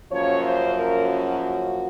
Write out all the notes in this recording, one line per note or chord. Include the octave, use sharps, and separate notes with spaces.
F#2 C#3 F3 A#3 C#5
C5
A#4
F#4